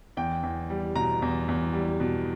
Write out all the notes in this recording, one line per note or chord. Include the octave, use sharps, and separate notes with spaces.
E2 G5
E2
G3
B2 A#5
E2
E2
G3
B2